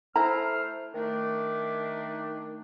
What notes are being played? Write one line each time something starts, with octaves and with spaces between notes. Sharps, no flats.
A3 E4 C5 A#5 F6
D#3 A3 D4